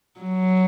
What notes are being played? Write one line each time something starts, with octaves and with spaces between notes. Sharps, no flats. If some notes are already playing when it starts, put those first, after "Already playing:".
F#3